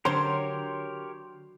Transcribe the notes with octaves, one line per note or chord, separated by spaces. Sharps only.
D3 F#3 G4 A#4 C5 C#5 C6